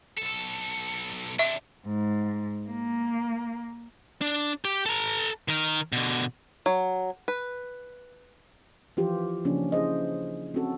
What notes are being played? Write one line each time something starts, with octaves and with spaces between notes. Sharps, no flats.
B1 A4
C3 D4 E5
G#2
A#3
D4
G4
A4 A#5
D#3 A#4
B2 D3
F#3
B4
E3 F3 F4 G4
C#3 F3 A#3 C#4 D4
E4 G#4 C5 D#5
C4 C#4 F#4 A4